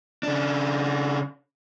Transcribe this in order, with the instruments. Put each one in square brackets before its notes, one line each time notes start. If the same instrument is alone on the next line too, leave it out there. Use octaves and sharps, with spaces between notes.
[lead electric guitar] C#3 D4